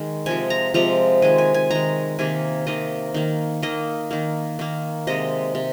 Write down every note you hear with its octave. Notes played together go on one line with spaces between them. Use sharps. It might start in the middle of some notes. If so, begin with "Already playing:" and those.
Already playing: D#3 G#3
C3 F3 G#3 G#5
A#5
C3 F3 G#3 A#5
D#3 G#3 G#5
G#5
G#5
D#3 G#3 A#5
C3 D#3 A#3 G#5
C3 D#3 A#3 D#5
D#3 A#3
D#3 A#3 D#5
D#3 A#3
D#3 A#3
C3 G#3 D#5
C3